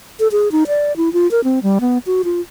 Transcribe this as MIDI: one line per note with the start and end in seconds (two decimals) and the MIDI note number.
0.20 0.28 69
0.32 0.51 68
0.52 0.64 63
0.67 0.96 74
0.97 1.12 64
1.13 1.30 65
1.31 1.41 70
1.44 1.59 60
1.63 1.79 55
1.81 1.98 59
2.06 2.22 66
2.24 2.41 65